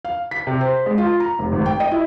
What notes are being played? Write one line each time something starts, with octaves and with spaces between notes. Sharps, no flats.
F5
B6
C3
C5
G#3
F4
A#5
F1
G#1
G5
D#5
E4